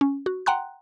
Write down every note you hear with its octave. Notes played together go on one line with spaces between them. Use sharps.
C#4
F#4
F#5 G5 A#5 C6 F#6